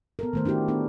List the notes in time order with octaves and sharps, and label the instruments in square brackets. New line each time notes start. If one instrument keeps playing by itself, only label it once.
[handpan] B3 A4 A#4
D#3 A3 C5
D4 E4 F#4 G4
B3 D4 A4